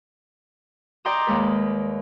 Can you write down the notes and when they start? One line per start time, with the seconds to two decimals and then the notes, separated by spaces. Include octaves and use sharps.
1.05 D5 D#5 G5 A#5 C6 D#6
1.27 D#2 G#3 B4